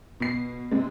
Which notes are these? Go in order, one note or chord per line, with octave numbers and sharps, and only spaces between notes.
B2 C7
C3 G#3